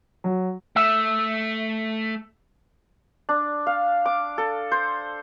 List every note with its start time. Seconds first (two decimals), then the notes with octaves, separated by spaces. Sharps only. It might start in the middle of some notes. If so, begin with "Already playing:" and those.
0.24 F#3
0.76 A3 E5
3.29 D4
3.67 F5
4.06 D6
4.38 A4
4.71 C5